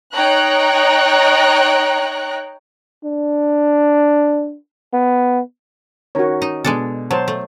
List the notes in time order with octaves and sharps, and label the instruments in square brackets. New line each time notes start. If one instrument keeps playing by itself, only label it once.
[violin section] D#4 C#5 G5 A#5 F#6
[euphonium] D4
B3
[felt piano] D#3 C#4 A#4 [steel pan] F#4 C#5
[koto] D#4
[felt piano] B2 [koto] G#3 D4 A4
[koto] F#3 [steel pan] C5 A5
[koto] A3